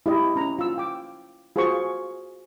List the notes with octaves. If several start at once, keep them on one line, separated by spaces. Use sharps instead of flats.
E4 G4 D#5
C#4 A#5
F4 E6
G5 D6
F4 F#4 G#4 C5 C6 C#6